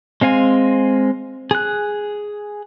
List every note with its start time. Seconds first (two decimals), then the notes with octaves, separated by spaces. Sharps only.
0.21 G#3 C4 F5 G#5
1.51 G#4 F#6